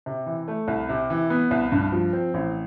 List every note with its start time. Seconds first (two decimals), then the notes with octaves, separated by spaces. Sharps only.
0.06 C3
0.26 E3
0.48 A3
0.68 C2
0.89 C3
1.10 E3
1.30 B3
1.51 C2
1.72 G2
1.92 F3
2.13 C4
2.34 A1